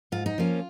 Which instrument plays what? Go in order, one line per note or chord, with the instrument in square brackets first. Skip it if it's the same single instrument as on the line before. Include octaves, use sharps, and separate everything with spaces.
[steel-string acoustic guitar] G#2 F4
D#4
F3 A#3 C#4 F4